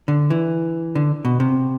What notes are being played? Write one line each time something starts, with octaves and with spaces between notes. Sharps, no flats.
D3
E3
D3
B2
C3